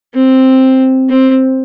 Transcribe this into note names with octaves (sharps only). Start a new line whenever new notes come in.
C4
C4